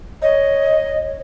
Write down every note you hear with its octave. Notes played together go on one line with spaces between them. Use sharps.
C#5 D#5